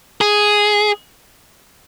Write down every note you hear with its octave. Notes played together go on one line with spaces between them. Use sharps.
G#4